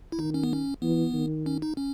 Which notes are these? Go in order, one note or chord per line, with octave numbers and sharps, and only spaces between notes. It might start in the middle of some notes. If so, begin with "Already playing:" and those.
E4
D#3 D#4
C#4
B3
C#4
E3 B3
D#3
C#4
D#4
C#4